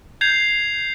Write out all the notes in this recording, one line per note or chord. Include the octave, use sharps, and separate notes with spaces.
G6 G#6 C7 F7